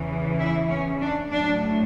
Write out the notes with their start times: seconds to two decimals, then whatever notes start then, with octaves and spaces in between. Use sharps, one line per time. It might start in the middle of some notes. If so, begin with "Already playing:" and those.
Already playing: E2 C#3 E3
0.40 E4
0.70 C#4
1.01 D4
1.31 A2 F#3 A3 D4